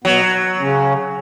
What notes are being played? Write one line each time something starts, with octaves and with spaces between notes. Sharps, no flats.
B2 F#3 B3
C#3 C#4